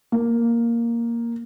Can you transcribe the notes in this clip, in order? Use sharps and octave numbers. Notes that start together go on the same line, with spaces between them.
A#3